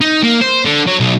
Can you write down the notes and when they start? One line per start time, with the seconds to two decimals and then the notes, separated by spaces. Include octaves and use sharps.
0.01 D#4
0.23 A#3
0.41 C5
0.66 D3
0.87 F#3
1.00 B1